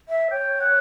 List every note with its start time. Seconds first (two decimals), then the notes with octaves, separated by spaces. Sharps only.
0.09 E5
0.31 C#5 G5
0.60 F#5